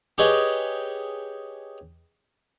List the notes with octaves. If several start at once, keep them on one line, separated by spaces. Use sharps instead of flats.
G4 G#4 B4 C#5 D#5 G5